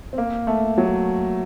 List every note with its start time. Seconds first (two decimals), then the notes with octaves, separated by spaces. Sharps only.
0.13 C4
0.18 A#3
0.47 A3
0.78 F#3